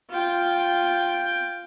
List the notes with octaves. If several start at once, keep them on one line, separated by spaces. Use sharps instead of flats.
F4 G5